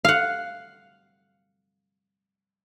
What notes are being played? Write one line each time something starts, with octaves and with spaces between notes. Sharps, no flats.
F5 F#5